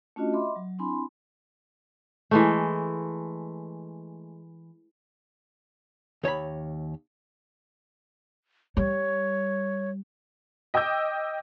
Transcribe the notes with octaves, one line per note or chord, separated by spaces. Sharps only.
A3 C#4 D4 F4 F#4 D#5
D#5 E5 B5 C6 D6
F#3
C4 D4 E4 G#5 B5 C6
E3 G#3 A3
D#2 C#5 A#5 B5
G3 C#5
D#5 G5 D6 E6 G6